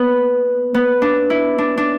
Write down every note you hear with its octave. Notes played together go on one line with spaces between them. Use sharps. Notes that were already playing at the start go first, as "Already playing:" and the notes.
Already playing: B3
B3
D4
E4
D4
D4